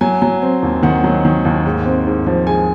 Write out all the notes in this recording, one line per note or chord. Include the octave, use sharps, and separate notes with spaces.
F#3 G#5
F#3
C4
D#2
D#3 F#5
F#3
D#3
D#2
G#2
C4
G#2
F3
G#3 G#5